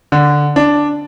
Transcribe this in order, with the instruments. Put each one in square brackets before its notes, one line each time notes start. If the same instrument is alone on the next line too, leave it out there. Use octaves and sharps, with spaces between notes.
[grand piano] D3
D4